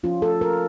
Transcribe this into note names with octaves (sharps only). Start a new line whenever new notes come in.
F3 C#4 F4
A4
A#4